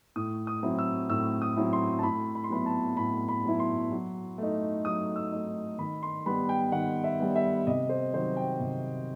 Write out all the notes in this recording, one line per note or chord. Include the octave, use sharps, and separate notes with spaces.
A2 D#6
D#6
F#3 C4 E4
E6
A2 E6
D#6
F#3 C4 E4
C6
A5
A2 B5
B5
C6
F#3 B3 E4 B5
A5
A2 B5
B5
F#3 B3 E4
C6
F#3
A3 D#4
F#3 D#6
E6
A3 D#4
D#3 B5
C6
G3 B3 B5
G5
D#3 F#5
E5
G3 B3
E5
C3 D#5
C5
D#3 F#3 C5
G5
C3